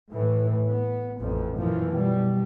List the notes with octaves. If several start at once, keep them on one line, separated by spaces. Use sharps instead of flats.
A2 E3
B3
A1 F2 A#2
F#2 A#2 E3 F3
B2 G3